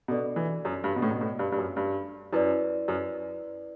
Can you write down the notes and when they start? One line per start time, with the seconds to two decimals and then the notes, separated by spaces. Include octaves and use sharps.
0.08 B2 D4 F#4 A4 D5
0.36 E3
0.65 F#2
0.84 G2
0.96 B2
1.02 A2
1.11 B2
1.21 A2
1.39 G2
1.52 G2
1.58 F#2
1.76 G2
2.32 F#2 E4 B4 D5
2.88 F#2